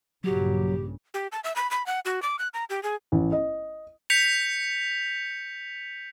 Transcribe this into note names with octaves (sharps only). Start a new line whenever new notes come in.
A#1 G2 C#3 F#3 G4
G4
A5
E5
B5
B5
F#5
F#4
D6
F#6
A#5
G4
G#4
A1
D#5
G6 B6 C#7 F7